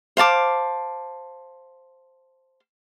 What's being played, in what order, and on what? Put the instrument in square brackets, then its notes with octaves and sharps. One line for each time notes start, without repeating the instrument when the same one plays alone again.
[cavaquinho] C5 F5 A5 D6